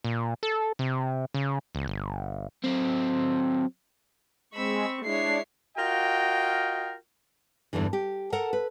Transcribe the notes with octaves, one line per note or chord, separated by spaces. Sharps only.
A#2
A4
C3
C#3
C#2
G1
F#3 C4
G#3 C4 B5 C#6 E6
G#3 D4 E4 C#5 C7
F4 F#4 A#4 D#5 G5
E2 G2 D3 E3
G4
A4 A#4 F#5
B4